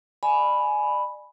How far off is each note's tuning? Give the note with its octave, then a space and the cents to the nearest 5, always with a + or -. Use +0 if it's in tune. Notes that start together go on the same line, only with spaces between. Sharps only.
D5 +35 G#5 +15 B5 +0